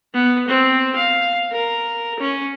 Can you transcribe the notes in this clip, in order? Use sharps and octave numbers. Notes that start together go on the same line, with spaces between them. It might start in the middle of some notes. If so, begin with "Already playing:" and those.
B3
C4
F5
A#4
C#4